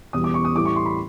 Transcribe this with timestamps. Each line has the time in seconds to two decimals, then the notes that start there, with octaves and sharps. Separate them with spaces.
0.13 E2 B2 G3 D#6
0.24 D6
0.34 C#6
0.45 D#6
0.56 A2 E3 G3 D6
0.65 C#6
0.76 C6
0.86 B5